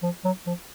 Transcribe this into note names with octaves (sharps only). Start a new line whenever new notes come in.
F3
F#3
F3